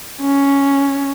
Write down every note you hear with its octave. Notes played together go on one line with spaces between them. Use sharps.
C#4